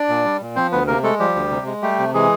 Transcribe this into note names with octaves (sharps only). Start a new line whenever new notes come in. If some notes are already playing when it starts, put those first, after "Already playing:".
Already playing: D4 D5
A#2
G3
A#2
F3 C4 C5
D2 B3 B4
C3 A#3 A#4
G#3 A3 A4
F3 G3 G4
D2
C3
G#3
G3 A3 G4
C3
E3 G#3 G#4